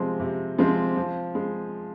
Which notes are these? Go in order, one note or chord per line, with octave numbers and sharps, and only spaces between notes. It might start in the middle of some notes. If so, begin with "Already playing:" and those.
Already playing: C3 F3 G#3 C4
C3
F3 G#3 C4
F3
G#3